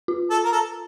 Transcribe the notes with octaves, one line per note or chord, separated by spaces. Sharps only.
F4
A4
A#4
A4